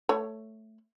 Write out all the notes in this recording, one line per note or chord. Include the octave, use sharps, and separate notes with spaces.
A3 C#5